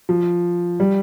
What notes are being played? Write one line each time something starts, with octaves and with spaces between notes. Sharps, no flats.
F3
G3